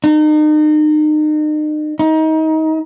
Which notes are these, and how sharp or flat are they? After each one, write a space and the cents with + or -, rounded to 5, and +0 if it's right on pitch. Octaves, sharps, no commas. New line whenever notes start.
D#4 -35
D#4 +25